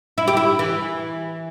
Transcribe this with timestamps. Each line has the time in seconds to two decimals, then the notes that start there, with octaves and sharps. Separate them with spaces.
0.18 E4
0.28 G4
0.37 E4
0.59 E3